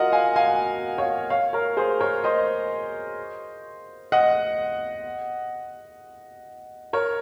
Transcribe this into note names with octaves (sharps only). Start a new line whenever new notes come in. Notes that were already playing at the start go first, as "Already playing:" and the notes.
Already playing: F4 F#4 A#4 D#5 F#5
F5 G#5
F5 G#5
C#5 F5
C#5 F5
A#4 C#5
G#4 C5
A#4 C#5
C5 D#5
D#5 F#5
A#4 C#5